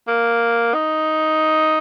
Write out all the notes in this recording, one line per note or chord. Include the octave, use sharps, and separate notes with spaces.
A#3
D#4